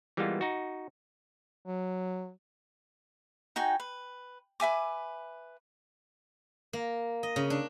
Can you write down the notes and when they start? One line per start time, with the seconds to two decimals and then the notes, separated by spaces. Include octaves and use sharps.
0.17 E3 G3 G#3 A#3 B3 F4
0.41 D#4 F#4
1.65 F#3
3.56 D#4 F#4 G5 G#5
3.80 B4
4.60 B4 E5 G#5 D6
6.73 A#3
7.23 D#5
7.36 C#3
7.50 D4